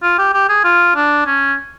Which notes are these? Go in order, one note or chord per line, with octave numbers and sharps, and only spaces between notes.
F4
G4
G4
G#4
F4
D4
C#4